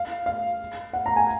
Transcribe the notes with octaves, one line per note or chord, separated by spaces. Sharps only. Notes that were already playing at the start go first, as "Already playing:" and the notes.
Already playing: F5
F5
F#5
A#5
G#5